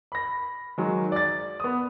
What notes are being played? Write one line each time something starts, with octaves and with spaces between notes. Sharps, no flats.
B5 A#6
D#3 F#3 G#3
D5 A6
B3 D#6